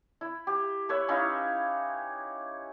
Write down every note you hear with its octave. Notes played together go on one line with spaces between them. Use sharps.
E4
G4
B4 C#5 E5
C#4 D#4 E4 F5